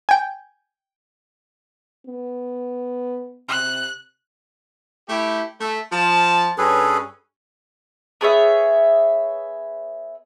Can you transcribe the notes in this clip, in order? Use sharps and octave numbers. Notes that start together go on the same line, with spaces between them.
G5 G#5
B3
C3 F#6
A3 E4 G4
A3
F3 A5
G2 C#4 G#4 A4 B4
B3 G#4 C#5 E5